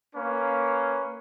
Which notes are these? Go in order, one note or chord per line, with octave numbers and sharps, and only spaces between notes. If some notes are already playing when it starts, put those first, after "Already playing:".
A#3 C#4 B4